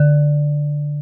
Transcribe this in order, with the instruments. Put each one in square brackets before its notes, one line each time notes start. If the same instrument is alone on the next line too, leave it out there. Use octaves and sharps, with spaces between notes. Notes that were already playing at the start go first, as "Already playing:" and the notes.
Already playing: [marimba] D3